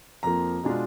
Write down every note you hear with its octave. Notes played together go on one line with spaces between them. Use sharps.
F2 F3 A#3 A#5
B2 G#3 D4 F4